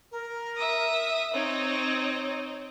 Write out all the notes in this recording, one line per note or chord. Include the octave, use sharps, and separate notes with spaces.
A#4
E5 D#6
C4 D#4 C#5